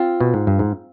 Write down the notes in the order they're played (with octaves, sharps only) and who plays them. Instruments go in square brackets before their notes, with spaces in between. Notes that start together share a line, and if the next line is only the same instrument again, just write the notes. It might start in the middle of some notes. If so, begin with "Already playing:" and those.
Already playing: [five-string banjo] C4 F4
[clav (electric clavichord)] B2
G#2
G2
G#2